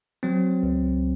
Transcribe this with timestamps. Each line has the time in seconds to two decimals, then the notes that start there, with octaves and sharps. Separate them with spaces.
0.23 F#3 C4
0.63 C#2